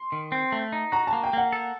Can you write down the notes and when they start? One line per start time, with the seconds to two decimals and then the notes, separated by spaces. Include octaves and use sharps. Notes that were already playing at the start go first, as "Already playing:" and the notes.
Already playing: C6
0.12 D#3
0.32 C4
0.52 A3
0.72 D#4
0.92 F#4 A#5
1.07 A5
1.13 A#3
1.23 G5
1.33 A#3 F#5
1.52 A4